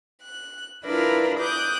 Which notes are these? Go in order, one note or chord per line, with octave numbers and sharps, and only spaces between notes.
F#6
D4 E4 F4 A#4 B4 D5
D6 D#6 F#6 G6